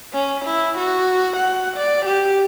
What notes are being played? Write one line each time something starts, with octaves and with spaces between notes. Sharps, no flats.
C#4
E4
F#4
F#5
D5
G4